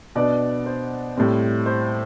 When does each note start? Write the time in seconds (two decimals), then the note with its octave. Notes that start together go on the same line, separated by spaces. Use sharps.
0.15 B2 B3 D4 D5
0.66 C5
1.17 A2 G3 C4
1.66 C5